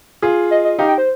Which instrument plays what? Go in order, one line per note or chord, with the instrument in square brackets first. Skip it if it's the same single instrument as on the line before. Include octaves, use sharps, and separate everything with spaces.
[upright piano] F4 G#4
[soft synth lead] D#5
D#5
[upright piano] D#4 G4 [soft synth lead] F5
[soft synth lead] G5
C5